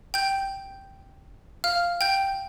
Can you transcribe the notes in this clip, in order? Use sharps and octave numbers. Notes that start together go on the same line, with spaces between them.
G5 G6
F5 F6
G5 G6